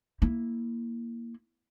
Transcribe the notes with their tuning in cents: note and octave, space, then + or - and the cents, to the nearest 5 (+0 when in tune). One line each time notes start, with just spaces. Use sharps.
A#3 +0 E4 +0